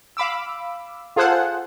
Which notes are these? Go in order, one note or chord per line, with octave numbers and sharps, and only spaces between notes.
F5 B5 D6 E6
F4 G#4 A4 C5 F#5